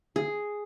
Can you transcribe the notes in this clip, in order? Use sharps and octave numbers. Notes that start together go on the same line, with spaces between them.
G#4